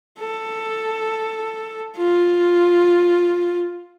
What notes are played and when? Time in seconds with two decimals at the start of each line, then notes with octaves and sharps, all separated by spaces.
0.20 A4
1.98 F4